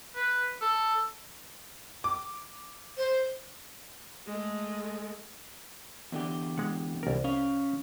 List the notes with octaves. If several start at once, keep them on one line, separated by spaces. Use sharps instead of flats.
B4
A4
D6
C5
G#3 A3
E2 D3 G4
G#3 F#5
C2 A#4
C#4 F5